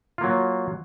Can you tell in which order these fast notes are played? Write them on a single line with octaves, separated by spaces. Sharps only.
F4 A#3 F#3